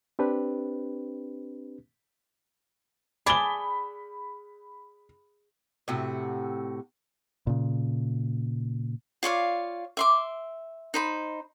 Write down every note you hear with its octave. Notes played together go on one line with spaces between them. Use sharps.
C4 D4 G4 B4
G#4 D5 A5 B5 G7
A2 C3 F#4
A#2 C#3
F4 C#5 D5 F5
E5 C6 D6
D#4 C5 B5